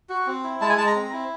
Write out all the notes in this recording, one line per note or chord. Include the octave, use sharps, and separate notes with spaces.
F#4
C4
E4
G#3 A5
G#5
G#3 A5
A#5
C4
E4